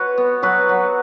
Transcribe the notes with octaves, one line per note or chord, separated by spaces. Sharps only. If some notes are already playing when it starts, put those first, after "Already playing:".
Already playing: F#4 B4 C#5
B3
F#3 F#4 B4
F#3